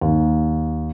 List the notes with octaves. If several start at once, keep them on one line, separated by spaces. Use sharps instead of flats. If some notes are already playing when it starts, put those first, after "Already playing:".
D#2